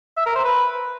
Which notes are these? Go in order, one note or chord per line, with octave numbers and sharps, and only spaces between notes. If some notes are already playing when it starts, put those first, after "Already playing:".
E5
A#4
C5
B4